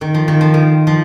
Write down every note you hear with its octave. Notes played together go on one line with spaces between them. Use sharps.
D#3
F3
D#3
F3
D#3
F3